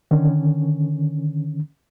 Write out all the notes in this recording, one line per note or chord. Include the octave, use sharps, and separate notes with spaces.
D3 D#3 C#4